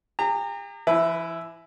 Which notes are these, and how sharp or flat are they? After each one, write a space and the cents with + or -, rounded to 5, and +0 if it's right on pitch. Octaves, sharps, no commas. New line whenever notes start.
G4 +45 A#5 -30
E3 +45 E4 +0 B4 +0